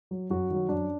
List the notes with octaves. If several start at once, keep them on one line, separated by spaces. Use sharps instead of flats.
F#3
F#2 F#4
D#3 F#3
F#2 D4